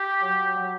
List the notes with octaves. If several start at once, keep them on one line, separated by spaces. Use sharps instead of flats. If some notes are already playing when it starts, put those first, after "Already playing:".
Already playing: G4
F#3
F#3